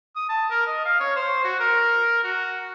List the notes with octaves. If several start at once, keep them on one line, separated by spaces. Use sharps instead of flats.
D#6
A5
A#4
D#5
F5
C#5
C5
F#4
A#4
F#4